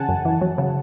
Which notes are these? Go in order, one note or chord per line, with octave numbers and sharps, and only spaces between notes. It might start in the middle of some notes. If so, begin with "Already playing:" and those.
Already playing: C#3 E3 F#5 G#5 A5
F#2
E3
F#3
C#3